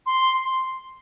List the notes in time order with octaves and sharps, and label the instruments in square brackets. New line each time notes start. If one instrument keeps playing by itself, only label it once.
[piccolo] C6